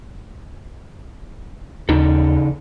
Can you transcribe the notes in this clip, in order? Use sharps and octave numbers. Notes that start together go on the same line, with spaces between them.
D#2 C#3 D#4 A4